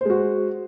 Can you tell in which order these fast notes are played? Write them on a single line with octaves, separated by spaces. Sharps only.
C5 G#3 F#4